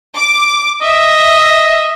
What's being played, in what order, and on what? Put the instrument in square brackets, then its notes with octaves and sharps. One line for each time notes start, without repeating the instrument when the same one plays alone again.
[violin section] D6
[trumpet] D#5 [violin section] E5